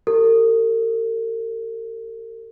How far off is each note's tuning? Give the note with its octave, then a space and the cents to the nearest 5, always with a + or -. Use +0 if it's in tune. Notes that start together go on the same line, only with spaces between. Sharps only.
G4 +0 A#4 -45